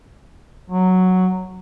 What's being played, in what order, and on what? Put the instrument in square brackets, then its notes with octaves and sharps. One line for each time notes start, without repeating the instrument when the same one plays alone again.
[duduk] F#3